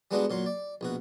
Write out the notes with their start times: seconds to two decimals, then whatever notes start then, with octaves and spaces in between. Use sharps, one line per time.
0.11 G3 G#3 B3 D4 F#4
0.30 A#2 F#3 C6
0.46 D5
0.81 A#1 B2 F#4